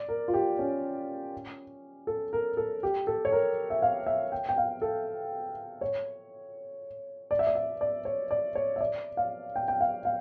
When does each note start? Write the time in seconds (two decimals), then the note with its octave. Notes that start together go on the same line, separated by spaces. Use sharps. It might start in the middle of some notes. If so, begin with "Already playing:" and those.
Already playing: D5
0.09 A#4
0.28 F4
0.34 G4
0.59 C#4
2.07 A4
2.33 A#4
2.57 A4
2.83 G4
3.07 A4
3.25 C#5
3.32 A#4
3.70 E5
3.82 F5
4.06 E5
4.32 G5
4.49 G5
4.58 F5
4.82 A4
5.81 C#5
7.31 D5
7.39 E5
7.47 D5
7.55 E5
7.81 D5
8.05 C#5
8.31 D5
8.55 C#5
8.76 E5
8.81 D5
9.17 F5
9.56 G5
9.68 G5
9.81 F5
10.05 F5